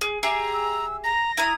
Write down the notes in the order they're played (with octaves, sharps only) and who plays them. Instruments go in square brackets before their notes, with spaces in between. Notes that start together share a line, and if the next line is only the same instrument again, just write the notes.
[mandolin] G#4
[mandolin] G4 G#4 E5 [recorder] A#5
[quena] E6
[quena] A#5 [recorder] A#6
[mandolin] E4 A#5 D#6 [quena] G#6